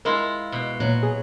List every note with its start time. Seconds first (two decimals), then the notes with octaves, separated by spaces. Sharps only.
0.05 G#3 E4 F4 A#4 D#5 C6
0.52 B2
0.80 A#2 F#3
1.03 G#4